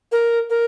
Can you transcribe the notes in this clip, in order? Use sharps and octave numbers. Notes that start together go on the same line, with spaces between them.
A#4
A#4